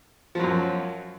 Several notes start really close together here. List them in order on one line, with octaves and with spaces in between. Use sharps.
F3 F#3 F#2